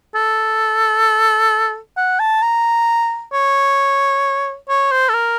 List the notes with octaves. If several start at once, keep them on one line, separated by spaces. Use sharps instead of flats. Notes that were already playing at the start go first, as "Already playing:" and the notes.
A4
F#5
A5
A#5
C#5
C#5
C5
A4
A#4